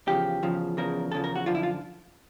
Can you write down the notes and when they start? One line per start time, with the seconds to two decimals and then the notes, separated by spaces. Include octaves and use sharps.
0.08 E2 C#3 F3 G4
0.43 E2 C#3 F3
0.77 E2 C#3 F3 A#4
1.12 E2 C#3 F3 A4
1.24 A#4
1.36 F#4
1.46 F#2 D3 F3 F4
1.55 E4
1.63 F4